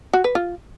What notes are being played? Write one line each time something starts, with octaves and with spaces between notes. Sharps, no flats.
F#4
B4
F4